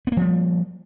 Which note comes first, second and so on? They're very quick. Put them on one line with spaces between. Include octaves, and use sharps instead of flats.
B3 A#3 F3 G3